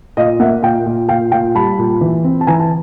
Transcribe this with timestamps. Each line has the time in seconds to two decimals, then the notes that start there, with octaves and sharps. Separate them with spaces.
0.17 A#2 D#5 F5
0.40 A#3 E5 F#5
0.62 A#2 F5 G5
0.86 A#2
1.09 A#2 F5 G5
1.32 A#2 F5 G5
1.55 G3 A5 B5
1.78 A#2
2.01 E3
2.24 C4
2.41 A5
2.47 E3 G#5 A#5
2.60 A5